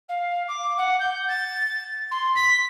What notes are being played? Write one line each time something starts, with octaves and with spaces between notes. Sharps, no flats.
F5
D6
F#5
G6
A6
C6
B6